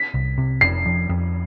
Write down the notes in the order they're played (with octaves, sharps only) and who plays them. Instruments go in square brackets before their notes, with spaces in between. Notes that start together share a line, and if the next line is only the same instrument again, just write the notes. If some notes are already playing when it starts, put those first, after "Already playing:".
Already playing: [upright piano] B6
[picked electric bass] C2
C3
[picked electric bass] F1 [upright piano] C7
[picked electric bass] F2
F2